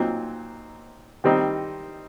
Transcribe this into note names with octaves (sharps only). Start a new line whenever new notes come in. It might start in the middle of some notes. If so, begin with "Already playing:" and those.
Already playing: A#2 F#3 C4 D#4
D#3 G3 C4 D#4